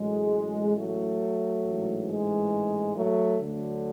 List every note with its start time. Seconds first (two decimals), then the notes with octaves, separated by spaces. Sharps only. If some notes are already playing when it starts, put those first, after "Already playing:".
Already playing: A1 A2 F#3 G#3
0.77 F#3 A3
1.64 A1 G#2 E3
2.08 G#3
2.96 F#3 A3
3.39 D2 D3 F#3